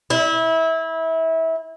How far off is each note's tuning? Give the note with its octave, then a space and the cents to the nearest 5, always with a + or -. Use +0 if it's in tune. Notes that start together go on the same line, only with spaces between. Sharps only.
E4 -25